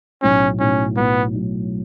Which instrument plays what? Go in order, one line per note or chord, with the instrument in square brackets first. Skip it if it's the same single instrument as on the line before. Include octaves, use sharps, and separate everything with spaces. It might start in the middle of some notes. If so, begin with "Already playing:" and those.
[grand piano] B1 A2 F#3 [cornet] C#4
[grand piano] B1 A2 F#3 [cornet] C#4
[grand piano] B1 A2 F#3 [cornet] B3
[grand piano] A2 F#3